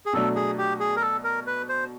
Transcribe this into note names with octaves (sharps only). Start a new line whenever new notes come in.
G#4
B2 F#3 A3 D4 A4
G#4
G4
G#4
A#4
A4
A#4
B4
C5